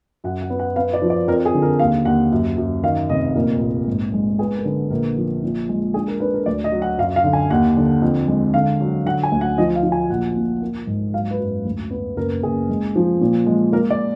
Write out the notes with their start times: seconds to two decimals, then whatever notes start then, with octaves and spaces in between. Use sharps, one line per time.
0.24 F#2 F#5
0.42 F#5
0.50 B3
0.59 F#5
0.76 B3 F5
0.94 D5
1.02 F3
1.10 D5
1.28 F2 A#4
1.45 G#4
1.54 D3
1.62 A#4
1.79 D#2 F5
2.05 D#2 F#5
2.32 F#2
2.57 F#2
2.83 D#3 F5
3.10 F1 D#5
3.35 A#2 A#4
3.61 A#1
3.87 G#2
4.13 G#3
4.39 B3 G#4
4.57 A#4
4.65 D3
4.90 A#1 A#4
5.16 F3
5.43 A#2
5.69 G#3
5.94 D4 G#4
6.08 A#4
6.20 D4 B4
6.34 A#4
6.46 D2 D5
6.64 D#5
6.72 F#3
6.82 F#5
6.98 F#2 F5
7.16 F5
7.24 D3
7.33 G#5
7.50 D#2 F#5
7.77 D3
8.02 F2
8.28 G#3
8.54 D3 F5
8.81 F#3
9.05 D3 F#5
9.23 G#5
9.32 D2
9.41 F#5
9.58 F3 D#5
9.75 F5
9.83 F3
9.92 G#5
10.10 A#1 F#5
10.36 A#2
10.62 A#3
10.87 G#2
11.13 F#3 F5
11.31 B4
11.39 F#2
11.65 D2
11.91 B3
12.17 F#1 A#4
12.43 F#1 G#4
12.69 G#3
12.96 F3
13.21 A#2
13.46 G#3
13.72 A#3 A#4
13.90 D5